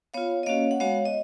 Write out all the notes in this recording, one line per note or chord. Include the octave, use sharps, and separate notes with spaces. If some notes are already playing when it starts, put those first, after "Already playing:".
B3 F4 C#5 F5
D#5
A#3 C#4 F#4 C#5 F5
F#5
G#3 B3 F#4 C#5 F5
D#5